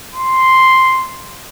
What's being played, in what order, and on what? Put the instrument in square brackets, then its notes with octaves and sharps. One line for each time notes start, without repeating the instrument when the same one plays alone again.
[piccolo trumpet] C6